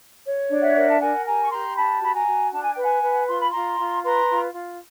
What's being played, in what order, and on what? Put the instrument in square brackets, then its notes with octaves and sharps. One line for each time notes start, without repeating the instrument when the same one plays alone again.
[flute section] C#5
D4
E5 F#5
A#4
A5
A#4 F#5 G#5
G4 G#5 A#5
C#6
G4 A#5 C6
D4 A5 B5
F#4 B5
G#5 A#5
F#4
D4 A5
G#5
G5
B4 F#5 G#5
B4
F4 C6
B5
F4 A#5 C6
F4
B4 A#5 C6
F4
F4